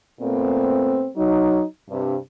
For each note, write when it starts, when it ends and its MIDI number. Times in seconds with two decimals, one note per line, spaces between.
0.20 1.08 46
0.20 1.08 57
0.20 1.08 59
0.20 1.08 60
1.16 1.63 54
1.16 1.63 63
1.90 2.16 43
1.90 2.16 48